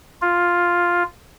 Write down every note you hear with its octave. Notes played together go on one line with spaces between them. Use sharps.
F4